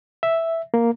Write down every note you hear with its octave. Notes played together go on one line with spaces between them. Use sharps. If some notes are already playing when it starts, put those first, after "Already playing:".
E5
A#3